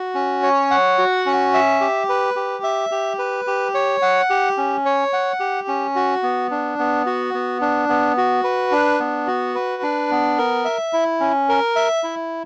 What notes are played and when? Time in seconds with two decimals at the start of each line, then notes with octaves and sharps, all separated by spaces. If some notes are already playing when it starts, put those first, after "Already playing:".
Already playing: F#4
0.15 C#4
0.43 C#5
0.71 F#5
0.98 F#4
1.26 C#4
1.54 E5
1.81 G4
2.09 B4
2.36 G4
2.64 E5
2.91 G4
3.19 B4
3.47 G4
3.74 C#5
4.02 F#5
4.30 G4
4.57 C#4
4.85 C#5
5.13 F#5
5.40 G4
5.68 C#4
5.96 F#4
6.23 B3
6.51 D4
6.79 B3
7.06 F#4
7.34 B3
7.61 D4
7.89 B3
8.17 F#4
8.44 B4
8.72 D4
9.00 B3
9.27 F#4
9.55 B4
9.83 D4
10.11 B3
10.38 A#4
10.65 E5
10.93 E4
11.20 C#4
11.49 A#4
11.76 E5
12.03 E4